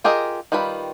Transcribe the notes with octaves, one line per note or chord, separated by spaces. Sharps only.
F4 G4 G#4 A#4 D#5
D#3 G3 F4 B4 B5